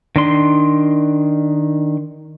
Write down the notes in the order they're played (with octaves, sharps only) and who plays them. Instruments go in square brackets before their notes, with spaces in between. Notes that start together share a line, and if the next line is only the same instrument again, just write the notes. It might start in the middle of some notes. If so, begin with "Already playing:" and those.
[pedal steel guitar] D#3 D4 C6